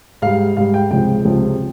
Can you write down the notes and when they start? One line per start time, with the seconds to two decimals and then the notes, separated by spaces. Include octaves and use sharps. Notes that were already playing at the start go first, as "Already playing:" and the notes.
0.22 G#2 G3 F5
0.57 G#2 G3 F5
0.74 G5
0.90 C#2 C3 F3 G#3 G5
1.25 C#2 C3 F3 G#3